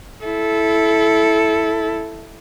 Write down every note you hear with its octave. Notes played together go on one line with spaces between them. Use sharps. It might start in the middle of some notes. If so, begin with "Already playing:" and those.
E4 A4